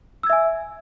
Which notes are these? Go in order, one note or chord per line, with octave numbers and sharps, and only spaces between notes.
E5 G#5 E6 G#6